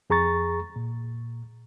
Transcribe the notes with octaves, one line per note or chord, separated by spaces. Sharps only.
F2 G#4 A#5 C#6 A6
A#2